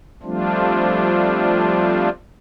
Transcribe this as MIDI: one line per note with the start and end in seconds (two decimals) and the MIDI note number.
0.23 2.09 53
0.23 2.09 55
0.23 2.09 57
0.23 2.09 60
0.23 2.09 62
0.23 2.09 65